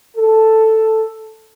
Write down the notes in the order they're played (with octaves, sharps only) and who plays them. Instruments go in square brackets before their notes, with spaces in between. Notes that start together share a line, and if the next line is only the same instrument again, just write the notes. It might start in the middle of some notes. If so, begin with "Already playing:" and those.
[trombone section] A4